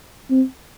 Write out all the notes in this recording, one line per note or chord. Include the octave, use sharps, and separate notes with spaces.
C4